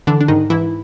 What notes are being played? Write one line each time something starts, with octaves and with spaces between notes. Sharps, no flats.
D3 E3 D4
D4
G#2 D#3 D#4
G#2 E3 E4